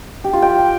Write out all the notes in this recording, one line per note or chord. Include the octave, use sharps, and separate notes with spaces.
G4
F4
G5